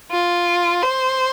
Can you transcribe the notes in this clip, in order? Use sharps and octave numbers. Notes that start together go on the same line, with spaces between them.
F4
C5